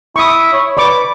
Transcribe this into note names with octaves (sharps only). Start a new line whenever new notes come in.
E4 C#6 D#6
C#5
B4 D5 C#6 D6